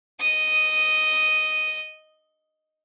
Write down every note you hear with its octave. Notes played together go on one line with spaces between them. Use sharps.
D#5 D#6